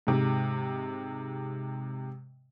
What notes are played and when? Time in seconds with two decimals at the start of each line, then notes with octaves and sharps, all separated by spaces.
0.07 G#2 C3